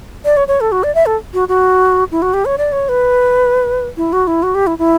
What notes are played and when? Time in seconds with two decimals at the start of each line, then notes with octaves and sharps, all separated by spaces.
0.25 D5
0.37 C#5
0.48 C#5
0.61 A4
0.72 F#4
0.83 D5
0.95 E5
1.06 A4
1.34 F#4
1.48 F#4
2.12 E4
2.22 F#4
2.34 G4
2.45 C#5
2.58 D5
2.72 C#5
2.89 B4
3.97 E4
4.13 F#4
4.27 E4
4.43 F#4
4.55 G4
4.67 E4
4.78 E4